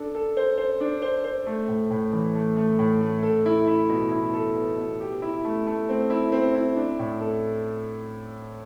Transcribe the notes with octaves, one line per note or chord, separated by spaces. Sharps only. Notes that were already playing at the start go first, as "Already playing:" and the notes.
Already playing: D4 A4
A4
C5
C5
D4
C5
C5
A3
A2
A2
E3
A3
A3
A2
A3
A4
E4
E4
B2
E4
A4
B3
B2
G4
E4
A3
A3
C4
E4
C4
E4
D4
A2
A4